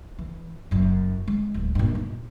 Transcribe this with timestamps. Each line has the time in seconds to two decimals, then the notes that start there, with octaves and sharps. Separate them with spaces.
0.19 E3
0.71 F#1 F#2
1.28 G#3
1.54 D1
1.75 G2 A#2
1.95 D#4